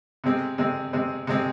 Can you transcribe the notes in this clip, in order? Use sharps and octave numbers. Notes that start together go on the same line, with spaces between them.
C3 G#3 C4
C3 G#3 C4
C3 G#3 C4
C3 G#3 C4